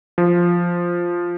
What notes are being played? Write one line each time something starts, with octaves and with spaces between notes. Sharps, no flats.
F3